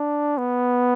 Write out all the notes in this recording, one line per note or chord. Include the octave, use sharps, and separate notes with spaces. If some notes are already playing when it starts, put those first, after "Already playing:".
Already playing: D4
B3